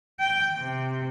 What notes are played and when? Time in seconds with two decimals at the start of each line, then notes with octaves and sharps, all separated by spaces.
0.20 G5
0.58 C3